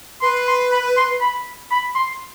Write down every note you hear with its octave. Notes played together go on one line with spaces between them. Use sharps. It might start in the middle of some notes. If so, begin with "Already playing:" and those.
B4 C6
C6
B5
C6
B5
B5
C6